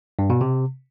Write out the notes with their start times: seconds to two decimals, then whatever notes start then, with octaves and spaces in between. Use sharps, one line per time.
0.19 G2
0.30 B2
0.41 C3